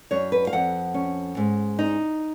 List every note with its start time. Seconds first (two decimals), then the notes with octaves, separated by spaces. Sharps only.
0.11 F#2 C#5
0.32 B4
0.47 F5
0.53 F2 F#5
0.94 C#4
1.37 G#2
1.79 D#4